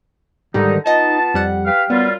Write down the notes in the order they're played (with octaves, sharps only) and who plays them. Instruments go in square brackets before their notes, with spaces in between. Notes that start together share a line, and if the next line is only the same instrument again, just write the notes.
[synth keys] G#2 D#3 G3 [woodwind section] D3 D#4
[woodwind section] B3 F4 A5 [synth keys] D#4 D#5
[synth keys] F2 G3 F#5
[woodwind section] G4 B4 F5
[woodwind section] F#2 G3 F4 [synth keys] B3